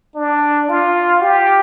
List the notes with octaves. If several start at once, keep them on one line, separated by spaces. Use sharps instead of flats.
D4
F4
G4